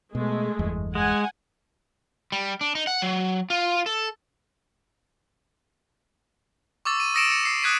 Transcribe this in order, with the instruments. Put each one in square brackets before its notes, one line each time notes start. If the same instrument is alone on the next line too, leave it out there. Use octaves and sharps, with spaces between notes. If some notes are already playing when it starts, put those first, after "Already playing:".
[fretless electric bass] B2 [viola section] G#3 A3
[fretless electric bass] F#1 E2 G2
[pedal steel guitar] G#3 [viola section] F#5 G#5
[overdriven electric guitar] G3
D4
D#4
F#5
F#3
F4
A4
[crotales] C#6 D6 E6 A6
D#7
D#6 E6 A#6 C#7 D7 E7
C#7
D#6 C7 C#7
D#6 F#6 G#6 B6 D#7